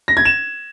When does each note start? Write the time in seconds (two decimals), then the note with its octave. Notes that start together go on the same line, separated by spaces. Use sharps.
0.08 A#6
0.17 G#6
0.25 E7